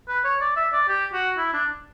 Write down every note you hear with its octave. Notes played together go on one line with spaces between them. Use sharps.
B4
C#5
D5
E5
D5
G4
F#4
E4
D4